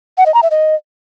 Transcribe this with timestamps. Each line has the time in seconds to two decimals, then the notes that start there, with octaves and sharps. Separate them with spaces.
0.18 F#5
0.26 D#5
0.34 A#5
0.43 E5
0.51 D#5